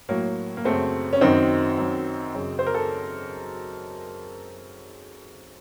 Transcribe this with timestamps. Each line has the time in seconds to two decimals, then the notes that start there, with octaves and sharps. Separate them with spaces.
0.09 A2 F#3 A#3
0.57 A#3
0.65 F#2 C#3 A3 C4
1.13 C#4
1.21 F#2 D#3 C4 D#4
1.78 F#2 D#3
2.35 F#2 C#3
2.59 C5
2.67 A#4
2.74 A4